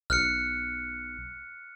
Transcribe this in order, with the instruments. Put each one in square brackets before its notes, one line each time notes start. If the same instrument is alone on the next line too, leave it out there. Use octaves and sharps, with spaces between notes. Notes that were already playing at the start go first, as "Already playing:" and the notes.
[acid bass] B1 [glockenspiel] F6 F#6 C#7